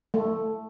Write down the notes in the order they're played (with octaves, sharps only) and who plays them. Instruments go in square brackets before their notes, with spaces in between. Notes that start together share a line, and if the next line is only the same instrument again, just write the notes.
[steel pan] A3